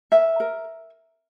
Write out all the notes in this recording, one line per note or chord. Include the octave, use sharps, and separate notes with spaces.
A#4 E5
A#4